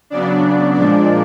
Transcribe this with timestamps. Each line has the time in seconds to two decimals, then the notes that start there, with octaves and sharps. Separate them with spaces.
0.10 C#3 F#3 B3 D4 D5
0.75 A#2 F3 G#3 D4 D5